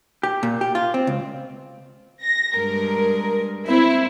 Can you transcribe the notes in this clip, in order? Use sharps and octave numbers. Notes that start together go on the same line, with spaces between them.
G4
A#2
G4
F4
C4
C#2
A#6
G2 G#3 A#4
C4 E4